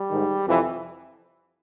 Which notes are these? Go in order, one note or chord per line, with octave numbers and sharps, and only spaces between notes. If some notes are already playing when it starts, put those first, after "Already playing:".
Already playing: G3
G#2 D#3
F2 C3 E3